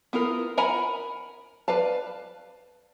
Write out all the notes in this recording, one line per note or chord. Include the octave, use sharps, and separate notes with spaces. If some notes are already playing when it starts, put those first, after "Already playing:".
B3 E4 F4 A#4
A#4 F#5 G#5 A#5 B5
B4 D5 F5 A5